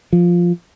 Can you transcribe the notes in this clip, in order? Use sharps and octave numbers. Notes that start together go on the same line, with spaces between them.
F3